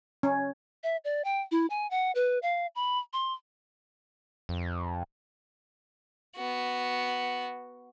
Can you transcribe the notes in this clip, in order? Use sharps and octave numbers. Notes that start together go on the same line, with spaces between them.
C#4
E5
D5
G5
E4
G#5
F#5
B4
F5
B5
C6
F2
B3 F#4